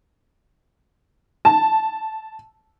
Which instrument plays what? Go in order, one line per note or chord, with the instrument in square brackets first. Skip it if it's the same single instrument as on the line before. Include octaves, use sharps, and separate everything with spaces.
[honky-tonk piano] A5